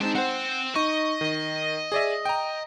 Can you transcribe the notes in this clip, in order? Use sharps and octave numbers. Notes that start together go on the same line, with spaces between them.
G#3 C4 D4 D#4 A5
C4 C5 F#5
D#4 D#5 C#6
D#3
G#4 D5 E5
G5 A#5